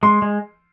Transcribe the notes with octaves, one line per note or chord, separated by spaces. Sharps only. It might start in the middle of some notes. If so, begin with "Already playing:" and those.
G#3 C6
G#3